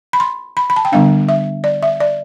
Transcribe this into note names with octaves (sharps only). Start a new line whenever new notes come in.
B5
C6
B5
B5
A5
G5
D3 G3 B3 D4 F5
E5
D5
E5
D5